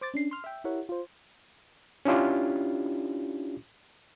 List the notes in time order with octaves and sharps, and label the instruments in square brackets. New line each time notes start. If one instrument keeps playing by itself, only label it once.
[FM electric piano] C5 D6 A6
C#4 D4 C7
C6 F6
E5 G5
E4 G4 A#4 C#5 E5 F#5
F4 C5
[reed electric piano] C#4 D4 E4 F4 G4